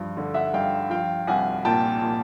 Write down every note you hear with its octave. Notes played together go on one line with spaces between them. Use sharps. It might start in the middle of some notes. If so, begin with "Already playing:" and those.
Already playing: G2 F3
D3
E5 F#5
G2 F5 G5
F3 F5 G5
C2 F#5 G#5
A#2 G5 A5
A#2